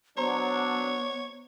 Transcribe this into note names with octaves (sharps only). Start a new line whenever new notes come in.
F#3 B3 D4 C5 C#5 A#5 C6